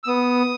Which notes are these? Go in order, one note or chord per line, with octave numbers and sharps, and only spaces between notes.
E6
B3 D#6